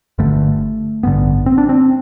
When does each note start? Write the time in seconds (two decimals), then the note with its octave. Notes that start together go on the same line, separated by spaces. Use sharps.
0.18 G1 G2 D3 A3
1.03 A1 G2 D3 B3
1.46 C4
1.58 D4
1.69 C4